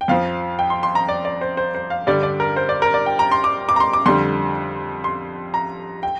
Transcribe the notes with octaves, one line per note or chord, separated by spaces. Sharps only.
G5
F2 F3 F5
G5
C6
C6
A#5
D5
D5
C5
C5
C5
F5
G2 D3 G3 D5
D5
A#4
C5
D5
A#4
D5
G5
A#5
C6
D6
D6
A#5
C6
D6
F2 D3 G3 C6
C6
A#5
G5